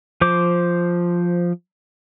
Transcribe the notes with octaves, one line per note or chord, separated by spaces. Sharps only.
F3 C5 D6